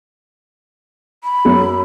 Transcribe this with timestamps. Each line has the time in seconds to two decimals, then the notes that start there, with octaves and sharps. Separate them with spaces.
1.24 B5
1.45 F#2 F#3